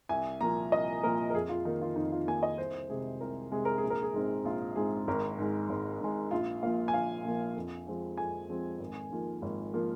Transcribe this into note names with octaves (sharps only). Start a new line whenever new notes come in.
C2 G#5
A#2 F3 A#3 A#5
C2 D#5
A#2 F3 A#3 A#4
A#4
F2 G#4
F4
D#3 A#3 D#4
F4
F2 D#4
F4
D#3 A#3 G#5
D#5
C2 C5
C3 G#3 G#4
C2 A#4
C3 G#3 G#4
A#4
G#4
A#1
A#4
G#4
G#2 G#3 C4
A#1 F4
G#2 G#3 C4 G#4
G#1 A#4
G#2 G#3
G#1
G#2 G#3
A#1 F4
A#2 F3 A#3 F5
G#5
A#1 F5
A#2 F3 A#3
F2
F3 G#3 C4
F2 G#5
F3 G#3 C4
G#1
G#2 F3 A#3
G#1
F3 A#3